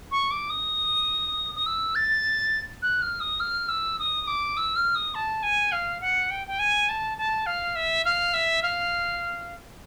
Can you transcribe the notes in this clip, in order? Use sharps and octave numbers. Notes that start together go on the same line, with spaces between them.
C#6
D6
D#6
D#6
E6
A6
F#6
F6
D#6
F6
E6
D#6
D6
E6
F6
D#6
A5
G#5
F5
F#5
G5
G5
G#5
A5
A5
F5
E5
F5
E5
F5